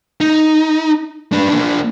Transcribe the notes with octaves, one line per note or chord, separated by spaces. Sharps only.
D#4
D4 B4
A#3 D4